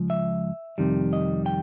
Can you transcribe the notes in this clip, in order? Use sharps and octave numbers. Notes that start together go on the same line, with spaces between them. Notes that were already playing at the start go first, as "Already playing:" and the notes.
Already playing: C#2 F3
E5
F2 C3 D#3 G3
D#5
G5